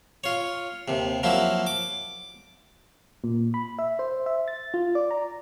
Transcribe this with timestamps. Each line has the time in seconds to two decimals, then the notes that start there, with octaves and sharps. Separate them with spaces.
0.24 F4 C#5
0.88 D#2 C3
1.23 F3 F#3 A#3 E4
1.67 D6
3.24 A#2
3.54 B5
3.79 E5
3.99 C5
4.26 E5
4.48 A6
4.74 F4
4.95 D5
5.11 A#5